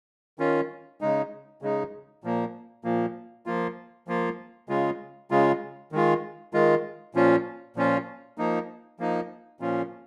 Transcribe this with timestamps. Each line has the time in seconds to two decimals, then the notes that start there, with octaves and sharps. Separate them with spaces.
0.39 D#3 C#4 F4
1.01 C#3 G#3 D#4
1.62 C#3 G#3 D#4
2.24 A#2 F3 A#3
2.84 A#2 F3 A#3
3.46 F3 A#3 F4
4.08 F3 A#3 F4
4.69 C#3 G#3 F4
5.31 C#3 G#3 F4
5.92 D#3 G#3 F4
6.53 D#3 G#3 F4
7.15 A#2 F3 C#4 F4
7.76 A#2 F3 C#4 F4
8.38 F3 A#3 D#4
8.99 F3 A#3 D#4
9.60 A#2 F3 C#4 F4